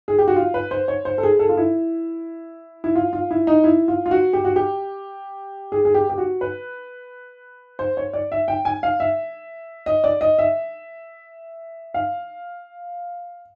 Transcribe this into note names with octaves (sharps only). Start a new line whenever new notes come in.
G#4
G4
F#4
F4
B4
C5
C#5
C5
A4
G#4
A4
F4
E4
E4
F4
F4
E4
D#4
E4
F4
F4
F#4
G4
F#4
G4
G#4
G#4
G4
G4
F#4
B4
C5
C#5
D5
E5
G5
G#5
F5
E5
D#5
D5
D#5
E5
F5